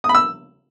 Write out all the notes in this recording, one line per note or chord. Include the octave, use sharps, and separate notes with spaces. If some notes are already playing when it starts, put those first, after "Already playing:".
D#6
B5
E6